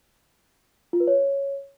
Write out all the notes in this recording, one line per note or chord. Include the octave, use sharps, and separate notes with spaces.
F4
B4
C#5